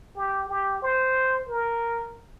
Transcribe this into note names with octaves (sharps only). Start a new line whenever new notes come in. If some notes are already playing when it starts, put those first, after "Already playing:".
G4
G4
C5
A#4